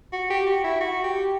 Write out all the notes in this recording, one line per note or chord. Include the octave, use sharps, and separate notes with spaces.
F#4
G4
F#4
E4
F#4
G4